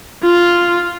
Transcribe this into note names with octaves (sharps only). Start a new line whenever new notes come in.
F4